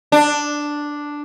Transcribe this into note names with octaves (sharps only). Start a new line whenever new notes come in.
D4